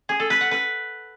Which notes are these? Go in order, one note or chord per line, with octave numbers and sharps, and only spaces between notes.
G#4
A4
B4
F#5
B4